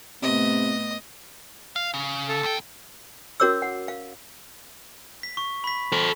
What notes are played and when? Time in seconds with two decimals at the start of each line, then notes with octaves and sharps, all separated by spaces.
0.22 A2 C3 A3 B3 D#5
1.76 F5
1.94 C#3
2.29 A4
2.43 D#2 G5
3.40 C#4 F#4 A#4 C#5 D6 E6
3.62 F#5
3.88 F5
5.23 B6
5.37 C#6
5.64 B5 B6
5.92 A4 C5